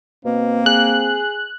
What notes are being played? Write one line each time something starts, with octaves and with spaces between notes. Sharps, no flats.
B2 A#3 C4
G#4 F#6